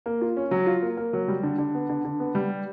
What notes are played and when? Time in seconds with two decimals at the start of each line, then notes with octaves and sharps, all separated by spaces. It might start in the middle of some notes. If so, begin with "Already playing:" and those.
0.06 A#3
0.21 F4
0.37 C#4
0.51 F#3
0.66 F4
0.82 A#3
0.97 A#3
1.13 F#3
1.28 G3
1.43 D3
1.58 D3
1.74 B3
1.89 D3
2.05 D3
2.19 B3
2.35 G3